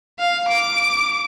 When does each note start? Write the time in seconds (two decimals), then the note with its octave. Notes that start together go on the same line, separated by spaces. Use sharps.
0.19 F5
0.48 D6 D7